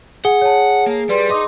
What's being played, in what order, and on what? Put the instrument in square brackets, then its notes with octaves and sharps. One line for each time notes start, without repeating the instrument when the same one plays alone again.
[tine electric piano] G#4 [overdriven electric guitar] F#5 [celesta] G7
[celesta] C#5 A5
[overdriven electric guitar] A#3
[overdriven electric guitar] G3 [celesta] B4 D5 C6
[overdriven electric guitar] D#4 D#5 [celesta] C6 D6 D#6